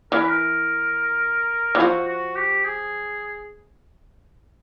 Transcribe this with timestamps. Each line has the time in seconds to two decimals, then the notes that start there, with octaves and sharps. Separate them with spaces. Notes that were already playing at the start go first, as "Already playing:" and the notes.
0.12 E3 A#4
0.19 B4
0.28 A#4
1.75 E3
1.80 F3 F#4
2.08 F#4
2.36 G4
2.64 G#4